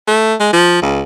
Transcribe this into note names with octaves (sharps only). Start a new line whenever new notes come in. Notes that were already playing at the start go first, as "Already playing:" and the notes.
A3
G#3
F3
C#2